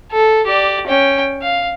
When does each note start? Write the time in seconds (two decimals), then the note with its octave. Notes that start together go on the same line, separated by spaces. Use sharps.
0.12 A4
0.46 G4 D5
0.87 C#4 G5
1.42 F5